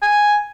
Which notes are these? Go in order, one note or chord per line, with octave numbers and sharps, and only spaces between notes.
G#5